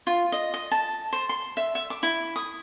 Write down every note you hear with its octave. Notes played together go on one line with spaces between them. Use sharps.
F4
D#5
D#5
A5
C5
C6
E5
E5
D6
E4
D#6